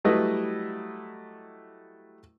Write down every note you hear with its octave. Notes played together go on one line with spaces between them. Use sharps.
F#3 G3 A3 E4 B4 D#5